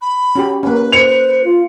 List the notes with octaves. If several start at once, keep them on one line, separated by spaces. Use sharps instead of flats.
B5
C#4 F#4 G4
A#3 C#4 B4
C5 C#7 F7
F4